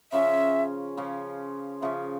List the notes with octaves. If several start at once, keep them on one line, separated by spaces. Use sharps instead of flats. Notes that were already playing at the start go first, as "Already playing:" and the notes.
C#3 F3 C#4 E5
C#3 F3 C#4
C#3 F3 C#4 E5